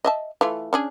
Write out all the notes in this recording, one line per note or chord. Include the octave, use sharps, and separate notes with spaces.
D#5 E5 A5
E3 A3 F4
C#4 D4 G#4